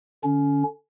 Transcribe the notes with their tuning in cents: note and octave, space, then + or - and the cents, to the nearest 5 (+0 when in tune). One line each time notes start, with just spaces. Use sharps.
D3 +0 C#4 +25